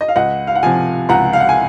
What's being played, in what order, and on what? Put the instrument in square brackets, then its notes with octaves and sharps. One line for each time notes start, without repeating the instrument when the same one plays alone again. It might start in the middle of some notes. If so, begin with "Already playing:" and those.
[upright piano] D#5
F5
C#2 D#5 F#5
F5
F#5
C3 F3 F5 G#5
C#2 F#5 A#5
F5
F#5
G#5